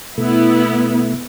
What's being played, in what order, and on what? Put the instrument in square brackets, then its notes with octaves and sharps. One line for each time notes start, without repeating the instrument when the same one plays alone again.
[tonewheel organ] B2 A3 [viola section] B3 E4